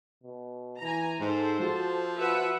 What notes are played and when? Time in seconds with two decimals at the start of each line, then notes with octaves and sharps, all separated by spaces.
0.23 B2
0.82 E3 G#5 A#5
1.20 G#2 G#3 A4 C5
1.60 F3 F#4
2.17 F#4 B4 E5 F#5